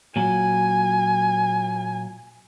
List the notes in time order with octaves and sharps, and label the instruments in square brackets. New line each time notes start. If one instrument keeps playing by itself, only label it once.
[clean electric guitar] A#2 F#3 [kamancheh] G#5